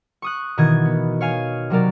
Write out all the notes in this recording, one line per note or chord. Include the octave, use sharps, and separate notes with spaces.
C#6 D#6 F#6
B2 D#3 E3 D#5 G#6
B3
C#5 F5 G#5
C3 F#3 A#4 D5